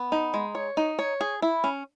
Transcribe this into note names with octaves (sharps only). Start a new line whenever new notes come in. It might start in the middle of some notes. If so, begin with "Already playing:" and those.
Already playing: B3
D#4
G#3
C#5
D#4
C#5
G#4
E4
C#4